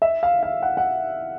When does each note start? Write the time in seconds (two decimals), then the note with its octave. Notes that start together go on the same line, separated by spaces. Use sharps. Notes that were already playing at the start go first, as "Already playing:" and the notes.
0.02 E5
0.23 F5
0.43 F5
0.63 F#5
0.77 F#5